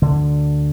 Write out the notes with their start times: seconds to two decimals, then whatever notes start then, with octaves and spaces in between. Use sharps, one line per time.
0.02 D2 D3